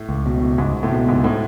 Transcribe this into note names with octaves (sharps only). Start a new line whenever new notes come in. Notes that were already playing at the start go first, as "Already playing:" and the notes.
Already playing: A2
C#2
B2
C#2
C#2 G#2
C#2
A2
B2
C#2 G#2
A2